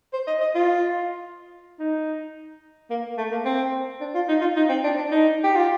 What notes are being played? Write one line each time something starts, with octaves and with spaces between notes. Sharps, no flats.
C5
D#5
D#5
F4
D#4
A#3
A3
A#3
C4
D4
F4
D#4
F4
D#4
C4
D4
D4
D#4
G4
F4